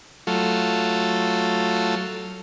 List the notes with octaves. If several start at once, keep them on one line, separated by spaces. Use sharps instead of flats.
F#3 A3 F4